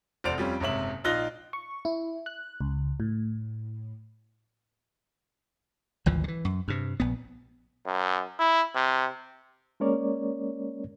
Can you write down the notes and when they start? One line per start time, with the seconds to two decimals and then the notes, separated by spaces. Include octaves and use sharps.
0.24 F1 E2 C5 D5 D7 F7
0.38 F2 G3 C#4 F4
0.60 F#1 G#2 C3 C#5 E5 F#7
1.04 A#1 D#4 F4 F#6 A#6 G7
1.53 C#6
1.85 E4
2.26 F#6
2.61 C#2
3.00 A2
6.06 G#1 D2 E3 F3
6.24 D3 E3
6.45 F#2
6.68 G2 C3
7.00 A#1 B3
7.86 F#2
8.39 E4
8.75 C3
9.80 G#3 A#3 C#4 A#4 C#5 D5